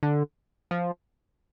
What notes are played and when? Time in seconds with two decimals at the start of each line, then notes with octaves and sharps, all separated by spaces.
0.03 D3
0.71 F3